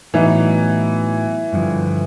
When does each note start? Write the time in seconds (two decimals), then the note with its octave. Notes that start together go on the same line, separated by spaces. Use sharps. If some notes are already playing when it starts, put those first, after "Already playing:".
0.14 A2 E3 F#3 B3 D#4
1.53 G2 D3 F3